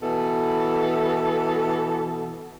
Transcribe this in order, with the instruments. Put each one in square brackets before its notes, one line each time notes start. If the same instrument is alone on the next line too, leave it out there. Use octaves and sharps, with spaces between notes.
[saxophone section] B2 E3 A4